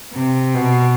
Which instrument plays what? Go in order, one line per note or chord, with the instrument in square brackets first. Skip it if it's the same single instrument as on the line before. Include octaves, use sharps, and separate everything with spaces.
[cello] C3
B2